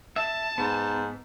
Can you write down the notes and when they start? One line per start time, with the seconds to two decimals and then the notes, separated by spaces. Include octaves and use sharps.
0.16 E5 A5
0.58 G#2 B3